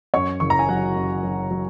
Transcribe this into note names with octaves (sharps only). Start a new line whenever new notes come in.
F#2 C#5 C#6
F#1 C#6
A#5
G#5
F#3 F#4 F#5
F#2
F#3
F#3